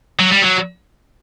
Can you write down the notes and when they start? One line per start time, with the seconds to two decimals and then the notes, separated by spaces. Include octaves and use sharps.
0.19 F#3
0.31 G3
0.42 F#3